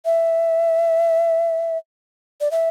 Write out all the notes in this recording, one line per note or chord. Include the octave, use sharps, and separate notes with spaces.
E5
D5
E5